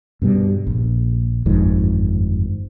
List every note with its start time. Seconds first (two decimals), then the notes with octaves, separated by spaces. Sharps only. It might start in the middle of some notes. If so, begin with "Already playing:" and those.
0.22 G2 B2 G3
0.67 A#1
1.46 G1 F2 G#2 D#3